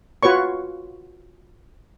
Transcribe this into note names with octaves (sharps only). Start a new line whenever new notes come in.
F4 F#4 B4 C#5 C#6